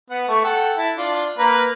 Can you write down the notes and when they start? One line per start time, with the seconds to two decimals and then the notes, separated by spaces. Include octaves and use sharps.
0.10 B3 F#5
0.28 A3 C#6
0.45 A4 F#5 G5
0.77 E4 A5
0.97 D4 F4 D5
1.39 A#3 A#4 B4